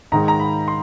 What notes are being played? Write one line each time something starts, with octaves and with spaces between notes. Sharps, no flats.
G#2 D#3 G#3 A#5
A#5
B5
C6